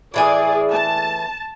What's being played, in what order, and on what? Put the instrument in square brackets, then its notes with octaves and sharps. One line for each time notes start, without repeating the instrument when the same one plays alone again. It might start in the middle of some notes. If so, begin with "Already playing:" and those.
[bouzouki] A2 E3 G#5 [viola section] G#4 D5
[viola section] A5